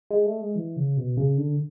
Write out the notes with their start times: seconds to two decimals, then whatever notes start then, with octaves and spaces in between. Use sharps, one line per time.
0.11 G#3
0.26 A3
0.41 G#3
0.56 E3
0.77 C#3
0.97 B2
1.17 C#3
1.38 D3